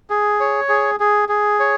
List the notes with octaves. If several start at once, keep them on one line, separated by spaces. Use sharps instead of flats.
G#4
C#5
G#4
G#4
G#4
C#5